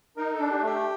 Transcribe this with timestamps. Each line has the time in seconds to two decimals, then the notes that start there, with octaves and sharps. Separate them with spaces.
0.17 D#4 A#4
0.34 A4
0.39 D4
0.50 G4
0.61 A3
0.67 G4